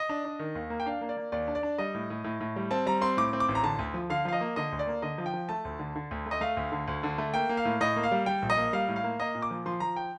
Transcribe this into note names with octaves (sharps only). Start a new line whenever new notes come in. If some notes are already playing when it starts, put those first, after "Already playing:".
Already playing: D#5
D4
D4
D#3
D#2
A#3
G5
D4 F5
A#3
D5
A#3
D#2 D5
D4
D5
D4
G3 D#5
A2
A2
A2
A2
G3
C4 A5
G3 A#5
C4 C6
A2 D6
C4
D6
A1
A#5
D3 A5
D2
F3
D3 F5
F3 F5
D#5
A#3
D3 D#5
D2
D5
A#3
D3 D#5
F3
G5
F3
A3 A5
D2
D3
D3
D2
A3
D#5
A3 F5
D2
D3
D2
D3
A3
A#3 G5
A#3
F5
A2
A2 D#5
A#3
F5
G3
G3 G5
A#1
D#5
A#3
G3 F5
A2
F5
A#3
A#3 D#5
A#2
D6
F3
F3 C6
F3 A#5
G5